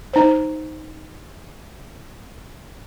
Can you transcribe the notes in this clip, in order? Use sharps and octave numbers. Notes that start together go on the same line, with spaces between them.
D#4 C5